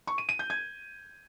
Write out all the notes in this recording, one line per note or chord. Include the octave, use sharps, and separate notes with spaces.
C#6
D#7
D#7
G6
G#6